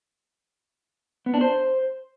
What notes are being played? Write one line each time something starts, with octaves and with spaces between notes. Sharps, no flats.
B3
D4
C5